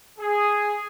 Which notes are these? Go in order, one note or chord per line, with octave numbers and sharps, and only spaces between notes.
G#4